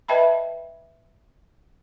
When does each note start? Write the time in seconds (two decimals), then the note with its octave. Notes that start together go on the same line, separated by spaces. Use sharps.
0.08 B4 D#5 E5 G5 A5 B5